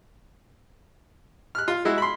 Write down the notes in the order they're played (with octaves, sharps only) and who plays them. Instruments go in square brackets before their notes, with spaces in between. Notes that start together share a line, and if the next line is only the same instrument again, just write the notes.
[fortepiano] F6 F#6
F4
G#3 E4 F#4
B5 C6